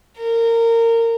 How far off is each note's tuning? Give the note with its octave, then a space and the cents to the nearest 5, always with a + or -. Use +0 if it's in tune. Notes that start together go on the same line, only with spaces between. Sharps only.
A#4 -20